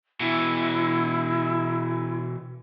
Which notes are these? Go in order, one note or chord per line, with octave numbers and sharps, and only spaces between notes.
B2 E3 E4